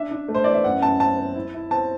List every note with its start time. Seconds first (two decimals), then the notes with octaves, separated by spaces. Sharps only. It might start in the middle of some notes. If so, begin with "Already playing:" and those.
Already playing: D4 E5
0.11 D4
0.28 A3
0.35 C5
0.44 E3 D5
0.54 E5
0.64 F#2 F#5
0.82 F#2 A5
1.00 C4 A5
1.18 C4
1.35 E4
1.54 E4
1.71 C4 A5